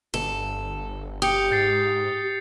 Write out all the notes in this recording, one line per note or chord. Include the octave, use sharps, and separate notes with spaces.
G1 A4
G4 D#6 G6 C#7
G#2 G6 A6 C7